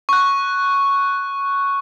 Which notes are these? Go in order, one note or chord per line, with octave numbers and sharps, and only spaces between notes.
C#6 F#6